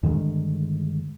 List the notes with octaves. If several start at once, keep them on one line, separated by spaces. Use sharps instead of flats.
G2 D3 D#3 G#3